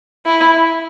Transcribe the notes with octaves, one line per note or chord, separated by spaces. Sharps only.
E4